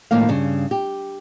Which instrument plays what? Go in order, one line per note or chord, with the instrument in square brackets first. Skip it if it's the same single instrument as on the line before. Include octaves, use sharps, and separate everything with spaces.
[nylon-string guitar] D#2 A2 D#3 F3 A#3 F5
G2 C#3
G4